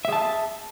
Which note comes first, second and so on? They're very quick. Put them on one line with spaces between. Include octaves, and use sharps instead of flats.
E5 G#4 A5